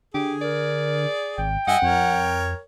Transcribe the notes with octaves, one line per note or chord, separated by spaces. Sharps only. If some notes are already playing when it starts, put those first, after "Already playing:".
D3 G4 G#4
A#4 D5
G#1 G5
G2 D#5 E5 F#5 G#5
F2 A#4 C#5